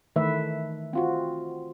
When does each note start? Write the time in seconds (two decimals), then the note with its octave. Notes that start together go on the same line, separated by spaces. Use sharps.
0.16 D#3 E3 A3 B4 E5
0.93 C4 F4 F#4